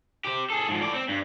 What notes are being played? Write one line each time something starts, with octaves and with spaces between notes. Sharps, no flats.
G4 C5
G#4 A4
G#2 F3
A2 D5
C4
G2